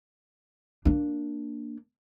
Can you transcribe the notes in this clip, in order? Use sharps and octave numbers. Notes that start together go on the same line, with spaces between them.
A#3 D4